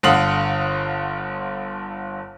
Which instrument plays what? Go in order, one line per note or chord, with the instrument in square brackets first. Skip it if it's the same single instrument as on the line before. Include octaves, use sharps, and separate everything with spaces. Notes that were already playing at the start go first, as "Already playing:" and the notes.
[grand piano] G1 D3 F5 F#5 D#6 F#7